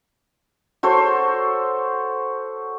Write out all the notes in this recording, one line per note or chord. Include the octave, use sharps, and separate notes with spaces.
F#4 A4 C5 C#5